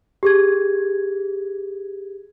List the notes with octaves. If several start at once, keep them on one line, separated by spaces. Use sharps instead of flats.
G4 G#4 G#6